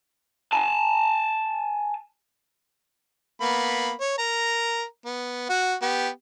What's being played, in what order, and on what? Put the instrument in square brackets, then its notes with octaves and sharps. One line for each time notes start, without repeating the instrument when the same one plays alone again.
[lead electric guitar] G#5 A5
[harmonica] A#3 B3 B5
C#5
A#4 A#5
B3
F#4 F#5
B3 G4